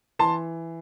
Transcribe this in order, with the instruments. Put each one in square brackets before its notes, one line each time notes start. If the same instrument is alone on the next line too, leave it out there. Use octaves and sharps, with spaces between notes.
[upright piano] E3 A5 C6